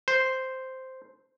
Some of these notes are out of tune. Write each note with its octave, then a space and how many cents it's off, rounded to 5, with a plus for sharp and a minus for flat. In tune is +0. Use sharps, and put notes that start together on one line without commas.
C5 -5